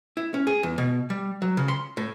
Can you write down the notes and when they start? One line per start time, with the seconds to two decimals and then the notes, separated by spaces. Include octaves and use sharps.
0.17 E4
0.34 C#4
0.47 G#4
0.63 E2
0.78 B2
1.10 G3
1.42 F#3
1.57 C#3
1.68 C6
1.97 A2